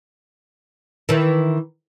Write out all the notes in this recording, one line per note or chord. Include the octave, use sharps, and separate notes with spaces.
D#3 E3